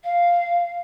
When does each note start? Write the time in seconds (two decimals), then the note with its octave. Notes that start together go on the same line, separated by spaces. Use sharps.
0.04 F5